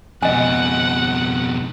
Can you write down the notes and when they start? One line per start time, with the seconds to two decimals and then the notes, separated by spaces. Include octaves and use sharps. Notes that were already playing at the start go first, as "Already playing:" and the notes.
0.23 F2 B2 D#5 F#5 G#5